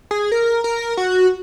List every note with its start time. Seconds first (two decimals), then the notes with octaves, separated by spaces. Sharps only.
0.11 G#4
0.32 A#4
0.64 A#4
0.97 F#4